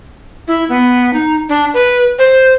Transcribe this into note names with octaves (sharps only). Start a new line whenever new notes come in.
E4
B3
D#4
D4
B4
C5